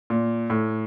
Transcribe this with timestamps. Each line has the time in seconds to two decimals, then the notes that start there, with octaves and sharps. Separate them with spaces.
0.10 A#2
0.50 A2